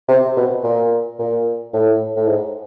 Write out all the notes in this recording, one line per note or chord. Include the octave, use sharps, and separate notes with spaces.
C3
B2
A#2
A#2
A2
A2
G#2